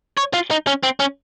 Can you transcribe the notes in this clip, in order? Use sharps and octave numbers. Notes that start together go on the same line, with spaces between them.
C#5
F4
D#4
C#4
C4
C#4